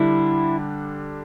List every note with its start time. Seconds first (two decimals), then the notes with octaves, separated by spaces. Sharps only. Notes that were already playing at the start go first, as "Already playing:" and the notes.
Already playing: D3 G3 D4 E4